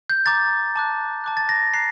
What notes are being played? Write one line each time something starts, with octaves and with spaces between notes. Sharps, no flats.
G6
A#5 D6 G6 A6
A5 D6 F#6
A5 D6 F#6
A6
A#6
A#5 F#6 C7